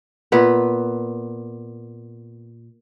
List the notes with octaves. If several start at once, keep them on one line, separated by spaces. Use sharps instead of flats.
A#2 B3 B4